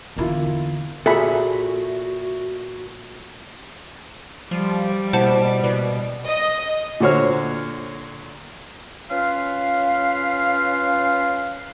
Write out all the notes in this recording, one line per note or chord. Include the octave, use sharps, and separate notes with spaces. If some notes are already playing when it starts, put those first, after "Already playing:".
E2 D3 A#3 E4 F4
A#2 F#4 G#4 A4 E5 F#5 B5
F3 G3
B2 A#3 E4 C5 F#5 A5
B2 B4 D5
D#5
A#2 D3 F#4 C5 C#5 F6
C#4 F4 B4 F5